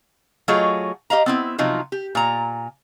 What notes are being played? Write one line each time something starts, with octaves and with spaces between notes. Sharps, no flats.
F#3 A3 F4 G#4 C#5 D#5
G4 D#5 F5 A#5
B3 C4 E4
C3 F3 F#3 D#4 F4
G4
A#2 A#5